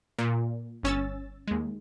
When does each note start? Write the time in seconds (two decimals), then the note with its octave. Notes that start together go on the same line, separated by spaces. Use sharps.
0.18 A#2
0.83 G1 C#4 E6 A6
1.47 D#2 G#3